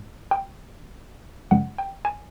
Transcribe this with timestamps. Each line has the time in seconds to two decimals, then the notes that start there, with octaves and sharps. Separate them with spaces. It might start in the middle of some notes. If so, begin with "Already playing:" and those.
Already playing: G#2
0.31 G5
1.51 F#2 C#3 F3 G#3 F#5
1.78 G5
2.05 G#5